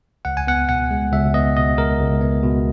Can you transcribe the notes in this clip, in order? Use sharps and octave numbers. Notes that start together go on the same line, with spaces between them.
C#2 F#5
G#5
B3 F#5
B2 F#5
G#3
C#2 E5
B3 D#5
B2 D#5
G#3 A#4
C#2
B3
B2